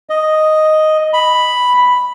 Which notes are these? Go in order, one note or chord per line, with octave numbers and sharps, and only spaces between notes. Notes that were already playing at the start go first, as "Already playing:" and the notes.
D#5
B5